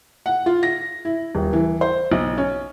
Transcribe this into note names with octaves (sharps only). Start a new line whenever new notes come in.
F#5
F4
A#6
E4
D#1
E3
C5
B1
C#4